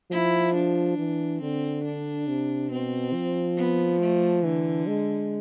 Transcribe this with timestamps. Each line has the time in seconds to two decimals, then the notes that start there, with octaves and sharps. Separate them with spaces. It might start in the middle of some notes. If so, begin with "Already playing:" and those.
0.11 F3 E4
0.55 D4
0.98 E3
1.41 D3 C4
1.85 D4
2.28 C3
2.71 B2 C4
3.13 F3
3.57 B3
4.01 A3
4.43 D3 E3
4.87 G#3